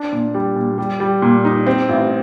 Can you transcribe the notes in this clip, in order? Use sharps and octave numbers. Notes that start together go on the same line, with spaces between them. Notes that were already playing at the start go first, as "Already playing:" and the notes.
Already playing: D4
A#2
G3
A#2
G3
G3
A#2
D#4
C4
A1